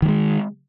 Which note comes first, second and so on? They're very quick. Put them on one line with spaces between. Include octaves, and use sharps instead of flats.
D#3 G3 G#3